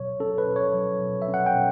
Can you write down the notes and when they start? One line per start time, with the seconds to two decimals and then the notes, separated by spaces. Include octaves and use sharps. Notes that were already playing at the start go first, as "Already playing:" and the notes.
Already playing: B2 F#3 C#5
0.20 C#4 A4
0.38 B4
0.47 B2
0.56 C#5
0.74 F#3
1.01 B2
1.22 E5
1.28 C#4
1.34 F#5
1.46 G5
1.55 B2